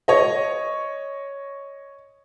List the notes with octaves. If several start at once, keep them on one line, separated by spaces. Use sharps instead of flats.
C#5 D#5